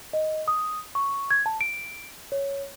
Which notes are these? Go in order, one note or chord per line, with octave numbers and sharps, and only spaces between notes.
D#5
D#6
C#6
G#6
A5
D7
C#5